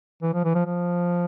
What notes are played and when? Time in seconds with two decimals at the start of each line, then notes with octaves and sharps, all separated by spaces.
0.22 E3
0.34 F3
0.44 E3
0.55 F3
0.65 F3